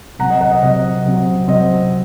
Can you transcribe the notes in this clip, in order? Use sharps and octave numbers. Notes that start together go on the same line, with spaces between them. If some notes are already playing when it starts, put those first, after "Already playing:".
C3 F#3 C4 F#5 A#5
D#5
D#5 F#5
D#5
C3 F#3 C4 D#5
C3 F#3 C4
C3 F#3 C4 D#5